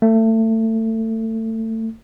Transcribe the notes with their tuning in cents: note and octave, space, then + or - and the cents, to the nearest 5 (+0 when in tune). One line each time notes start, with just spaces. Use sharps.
A3 +25